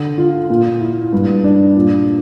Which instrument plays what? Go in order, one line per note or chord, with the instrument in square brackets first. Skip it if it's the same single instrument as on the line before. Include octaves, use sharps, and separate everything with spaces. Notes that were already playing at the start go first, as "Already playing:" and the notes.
Already playing: [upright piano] D3
F4
A#2
E4
G2
D4
A#2